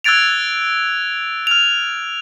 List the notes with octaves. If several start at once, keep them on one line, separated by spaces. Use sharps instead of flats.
E6 F#6 G#6 A6 D7 F7
F6 F7